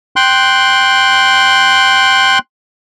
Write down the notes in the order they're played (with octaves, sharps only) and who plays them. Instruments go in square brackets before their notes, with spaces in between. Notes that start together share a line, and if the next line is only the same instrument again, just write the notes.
[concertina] G5 C6 F#6